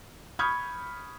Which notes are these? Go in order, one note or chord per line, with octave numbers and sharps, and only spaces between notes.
B5 C#6 D#6 F6 G6 G#6